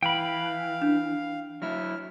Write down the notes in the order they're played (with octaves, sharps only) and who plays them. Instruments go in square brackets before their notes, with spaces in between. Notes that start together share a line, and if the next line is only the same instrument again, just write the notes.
[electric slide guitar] E3 [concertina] F5 [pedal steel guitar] G5 B5
[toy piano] D4
[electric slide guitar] F#3 E4 [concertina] F6